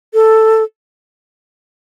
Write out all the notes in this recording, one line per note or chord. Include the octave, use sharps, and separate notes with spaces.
A4